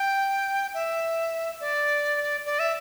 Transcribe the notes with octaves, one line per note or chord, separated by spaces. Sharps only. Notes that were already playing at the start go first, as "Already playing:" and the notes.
Already playing: G5
E5
D5
D5
E5